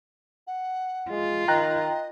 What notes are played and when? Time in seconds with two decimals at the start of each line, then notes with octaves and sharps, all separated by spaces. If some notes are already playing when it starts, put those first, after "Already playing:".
0.47 F#5
1.10 G#3 F4
1.48 D#3 D#5 G5 A#5 F#6